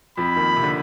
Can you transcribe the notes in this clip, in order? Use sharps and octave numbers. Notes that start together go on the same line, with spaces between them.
F2 F3 B5
D#2 D#3
C3
D3